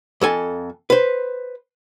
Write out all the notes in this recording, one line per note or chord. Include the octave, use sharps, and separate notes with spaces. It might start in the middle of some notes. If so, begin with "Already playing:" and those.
F2 A4 G#5
B4 C5